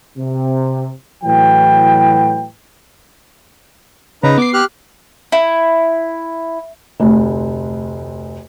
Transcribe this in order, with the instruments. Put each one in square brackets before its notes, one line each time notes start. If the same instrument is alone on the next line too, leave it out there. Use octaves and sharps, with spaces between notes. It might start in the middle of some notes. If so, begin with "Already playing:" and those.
[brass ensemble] C3
A2 E3 F#3 F#4 B4 G5
[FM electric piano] C#3 [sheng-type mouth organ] D#4 B4 A#5
[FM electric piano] B3 C7 [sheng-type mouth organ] D6
[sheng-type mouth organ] G4 F6 F#6
[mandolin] E4
[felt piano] F1 D2